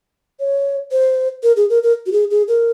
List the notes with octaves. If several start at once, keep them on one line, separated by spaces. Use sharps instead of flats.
C#5
C5
A#4
G#4
A#4
A#4
F#4
G#4
G#4
A#4